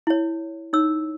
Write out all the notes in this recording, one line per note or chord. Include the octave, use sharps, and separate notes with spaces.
E4 C#5
D#4 C#5 E6